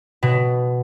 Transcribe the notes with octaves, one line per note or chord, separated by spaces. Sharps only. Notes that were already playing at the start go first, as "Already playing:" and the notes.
B2